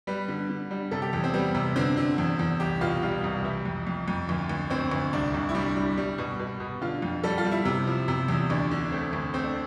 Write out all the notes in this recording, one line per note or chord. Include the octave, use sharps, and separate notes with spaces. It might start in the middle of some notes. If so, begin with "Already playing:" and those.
G3 B4
D3
D3
G3
C3 A4
G4
E2
C4
G3 B3
C3
D3 C4
D3
E2
E2
C2 G4
B2 F4
G3 F4
C2
E3 E4
F2
F2
F2
D2
D2
D2 C4
D2
C2 D4
C2
E4
G3 D4
G3
G3
B2
B2
B2
D3 F4
F2
G3 A4
F4
G3
E4
C3
F3
C3
E2
D2 D4
D3
A3 C4
D2
A3 C4
D4